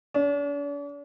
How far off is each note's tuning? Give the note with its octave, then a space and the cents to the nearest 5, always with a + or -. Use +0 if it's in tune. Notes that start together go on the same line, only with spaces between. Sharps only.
D4 -45